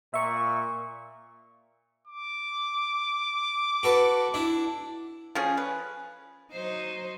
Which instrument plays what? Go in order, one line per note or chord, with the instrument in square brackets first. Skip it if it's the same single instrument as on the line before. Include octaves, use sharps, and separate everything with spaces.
[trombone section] A#2 [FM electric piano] E5 C#6
[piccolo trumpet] D6
[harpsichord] F#4 A4 B4
D4 E4
[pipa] F3 C#4 G#4
B4
[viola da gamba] F#3 D#4 C5